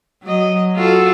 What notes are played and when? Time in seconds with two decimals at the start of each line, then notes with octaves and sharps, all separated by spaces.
0.23 F#3 D#5
0.76 F4 F#4 A4